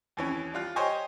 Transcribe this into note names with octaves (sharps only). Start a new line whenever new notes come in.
D#2 E3 C#4
G3 F4 F#6
G4 C5 C#5 D#5 G#5